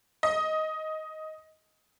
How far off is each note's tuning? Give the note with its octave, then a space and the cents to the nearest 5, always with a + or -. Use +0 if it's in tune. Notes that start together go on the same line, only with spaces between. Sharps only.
D#5 +15